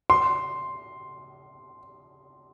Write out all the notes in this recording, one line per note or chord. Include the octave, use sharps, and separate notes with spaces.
C6